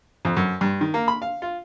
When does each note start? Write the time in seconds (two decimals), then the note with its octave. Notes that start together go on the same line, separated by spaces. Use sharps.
0.25 F2
0.37 F#2
0.61 G2
0.81 D#3
0.94 A#3
1.08 B5
1.22 F5
1.42 F4